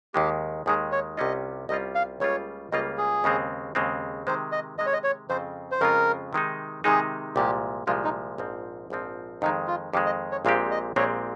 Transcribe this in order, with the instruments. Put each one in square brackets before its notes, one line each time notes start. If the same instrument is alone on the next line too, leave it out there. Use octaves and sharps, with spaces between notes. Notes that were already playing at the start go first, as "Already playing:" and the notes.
[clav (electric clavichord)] D#2 D#3 G#3 [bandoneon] G4
[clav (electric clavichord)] D#2 D#3 G#3 [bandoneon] G#4
[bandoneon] C#5
[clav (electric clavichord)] C2 C3 G3 C#4 F4 [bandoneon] D#5
[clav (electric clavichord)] C2 C3 G3 C#4 F4 [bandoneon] D#5
[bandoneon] F5
[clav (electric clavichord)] C#2 C#3 G3 A#3 F4 [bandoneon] C#5
[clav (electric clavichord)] C#2 C#3 G3 A#3 F4 [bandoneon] D#5
[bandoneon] G#4
[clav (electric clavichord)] D#2 C#3 G#3 C4
D#2 C#3 G#3 C4
[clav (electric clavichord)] C3 D#3 G#3 [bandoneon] C5
[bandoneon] D#5
[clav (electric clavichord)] C3 D#3 G#3 [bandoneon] D#5
[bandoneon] C#5
D#5
C#5
[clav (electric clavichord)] F2 C#3 G#3 C4 F4 [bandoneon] C5
[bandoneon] C5
[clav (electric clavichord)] F2 C#3 G#3 C4 F4 [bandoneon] A#4
[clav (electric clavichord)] C3 D#3 G#3 D#4
[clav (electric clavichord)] C3 D#3 G#3 D#4 [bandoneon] G#4
[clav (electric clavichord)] C2 A#2 F3 G#3 [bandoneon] G4
[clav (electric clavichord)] C2 A#2 F3 G#3 [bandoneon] F4
[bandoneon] D#4
[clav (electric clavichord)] A#1 G#2 F3 C4
A#1 G#2 F3 C4
[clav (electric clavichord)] F2 D#3 G#3 [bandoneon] D#4
[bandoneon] F4
[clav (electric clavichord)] F2 D#3 G#3 [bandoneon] G4
[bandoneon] D#5
C#5
[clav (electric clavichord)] A#1 A#2 G#3 C4 G4 [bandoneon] F5
[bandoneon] D#5
[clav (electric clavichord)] A#1 A#2 G#3 C4 G4 [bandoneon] C#5